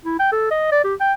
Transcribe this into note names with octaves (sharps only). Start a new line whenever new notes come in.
E4
G5
A4
D#5
D5
G4
G5